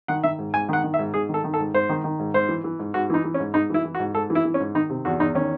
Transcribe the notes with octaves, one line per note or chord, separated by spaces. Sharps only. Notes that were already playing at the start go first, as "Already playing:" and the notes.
D#3 F#5
D#3 E5
G#2
G#2 G#5
D#3 F#5
D#3
E5
G#2
G#2 G#4
D#3
A4
D#3
A4
G#2
G#2 C5
D#3
D#3
G#2
G#2 C5
E3
E3
G#2
G#2 F#4
E3 D#4
E3
C#4
G#2
G#2 D#4
E3 E4
E3
F#4
G#2
G#2 A4
E3
E4
E3
C#4
G#2
D#3 D#4
C3
E2 F#4
E2 D#4
D#3 C#4